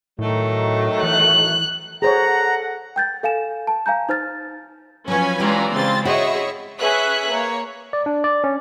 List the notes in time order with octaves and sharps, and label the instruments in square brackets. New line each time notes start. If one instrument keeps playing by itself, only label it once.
[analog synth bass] A2 [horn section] D#3 F#3 A3
[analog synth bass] E3 [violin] F#6
[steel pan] G#4 C5 C#5 [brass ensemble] A4 F#5 [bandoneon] A#5
[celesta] G5 G6 A6
A4 F5 G#5 E7
A5
F5 G#5 A#5 G6
D#4 C5 F6 A6
[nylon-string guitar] F3 F#3 [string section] C#4 [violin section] B4 G#5
[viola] E3 D5 [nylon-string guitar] G#3 G4 [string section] C#4 F4 A#5
[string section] C#3 C4 F4 [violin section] C6 A6
[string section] E4 [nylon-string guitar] F#4 [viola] G#4 D#5 [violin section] C#5 E5 C#6
[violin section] C#4 G#4 B4 C#5 E5 F#6
A#3 C#5
[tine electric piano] D5
D4
D5
C#4